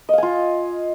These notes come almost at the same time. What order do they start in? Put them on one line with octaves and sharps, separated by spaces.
D#5 F5 G#5 F4